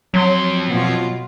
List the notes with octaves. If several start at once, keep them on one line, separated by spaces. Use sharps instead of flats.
F2 F#3 C6
B2 F4